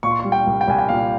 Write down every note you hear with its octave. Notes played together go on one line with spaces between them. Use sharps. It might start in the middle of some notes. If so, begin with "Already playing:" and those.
A#2 C#6
C6
C#6
G3
G5
C2
G5
C2 G#5
G5
A#2 F5